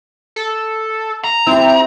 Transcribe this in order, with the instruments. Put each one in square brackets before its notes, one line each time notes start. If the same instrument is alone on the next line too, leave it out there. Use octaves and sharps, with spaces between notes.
[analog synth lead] A4
[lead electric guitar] A#5
[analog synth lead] C4 [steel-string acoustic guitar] E4 G4 [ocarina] E5